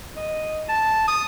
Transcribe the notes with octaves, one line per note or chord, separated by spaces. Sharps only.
D#5
A5
D#6